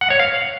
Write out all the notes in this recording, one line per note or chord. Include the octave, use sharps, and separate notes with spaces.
F#5
C#5
F5